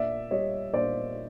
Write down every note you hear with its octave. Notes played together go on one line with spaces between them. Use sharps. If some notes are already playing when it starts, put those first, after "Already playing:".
Already playing: A#2 D5 E5
G3 C#5 D#5
A#2 C5 D5